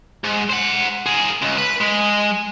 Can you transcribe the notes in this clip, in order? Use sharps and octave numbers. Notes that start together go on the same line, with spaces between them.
G#2
C5 F#5
G#4 A#4
C#2
B4
G#3